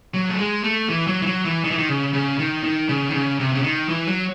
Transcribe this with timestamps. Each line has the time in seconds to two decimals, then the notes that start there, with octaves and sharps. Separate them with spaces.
0.14 F#3
0.29 A3
0.38 G#3
0.64 A3
0.89 E3
1.07 F#3
1.22 E3
1.26 F#3
1.45 E3
1.64 D#3
1.71 E3
1.78 D#3
1.89 C#3
2.13 C#3
2.39 D#3
2.64 D#3
2.89 C#3
3.09 D#3
3.13 C#3
3.39 C3
3.52 C#3
3.64 D#3
3.89 E3
4.08 F#3